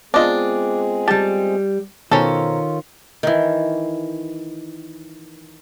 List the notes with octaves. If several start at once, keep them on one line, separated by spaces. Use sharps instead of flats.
G#3 B3 C4 D4 F4 G#4 D#5
G3 G4 A5
B2 D#3 C#4 F4 A4 C5 A#5
D#3 E3